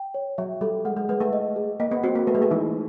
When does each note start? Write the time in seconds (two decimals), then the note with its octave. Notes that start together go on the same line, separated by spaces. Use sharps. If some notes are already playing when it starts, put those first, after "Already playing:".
Already playing: G5
0.14 C#5
0.38 F#3 E5
0.61 G3 A4
0.85 G#3 F#5
0.97 G#3
1.09 G#3 B4
1.20 A3
1.33 D#5
1.56 G#4
1.80 A#3 D#5
1.91 B3
2.03 C4 F#4
2.15 A#3
2.27 A3 B4
2.35 G#3
2.42 A3
2.50 E3 D#4